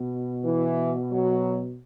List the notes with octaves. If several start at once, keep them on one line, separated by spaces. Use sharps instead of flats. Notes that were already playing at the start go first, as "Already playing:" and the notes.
Already playing: B2
E3
F#3